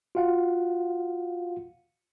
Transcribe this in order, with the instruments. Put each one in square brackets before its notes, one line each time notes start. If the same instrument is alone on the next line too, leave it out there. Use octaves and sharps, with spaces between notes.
[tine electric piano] F4 F#4 F5 F#5